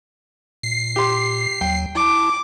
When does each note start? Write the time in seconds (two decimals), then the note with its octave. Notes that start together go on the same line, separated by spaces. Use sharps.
0.63 A#2 C7
0.96 G4 C6
1.61 D#2 F#3 G5
1.95 E4 A5 D6